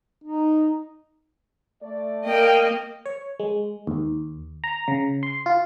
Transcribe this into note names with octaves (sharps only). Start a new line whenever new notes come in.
D#4
A3 D5
A#3 D#5 G5
C#5
G#3
D#2
A#5
C#3
C6
F4